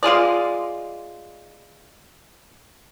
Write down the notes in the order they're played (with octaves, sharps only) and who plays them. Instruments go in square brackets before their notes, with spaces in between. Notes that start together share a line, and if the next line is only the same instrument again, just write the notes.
[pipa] G#3 F4 G#4 D5